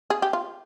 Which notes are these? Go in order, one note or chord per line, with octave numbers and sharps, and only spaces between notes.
G#4
G4
F4